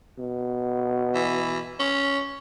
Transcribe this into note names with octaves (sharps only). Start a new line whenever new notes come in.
B2
E3
C#4